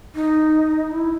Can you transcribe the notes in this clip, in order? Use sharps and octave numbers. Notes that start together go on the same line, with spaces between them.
D#4
E4